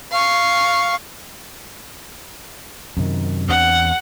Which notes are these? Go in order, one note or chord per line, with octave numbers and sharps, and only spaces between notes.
F5 C#6
F#2 C3 D#3
E2 C4 D4 F#5